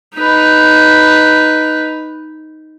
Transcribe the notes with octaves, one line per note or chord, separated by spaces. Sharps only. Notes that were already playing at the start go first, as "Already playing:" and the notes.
D#4 B4